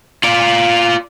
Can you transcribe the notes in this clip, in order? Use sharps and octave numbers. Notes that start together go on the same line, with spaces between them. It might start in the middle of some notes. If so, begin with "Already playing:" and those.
F4 D5